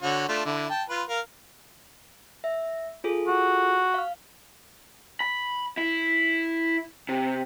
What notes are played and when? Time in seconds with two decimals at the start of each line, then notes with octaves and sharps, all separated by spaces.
0.03 D3 F#4 C#5
0.29 A3 D4 F4
0.46 D3 E4
0.70 G5 A5
0.89 F4 B4
1.09 A#4 F5
2.44 E5
3.04 F4 G#4 A4
3.27 F#4
3.94 F5 F6
5.20 B5
5.77 E4
7.09 C3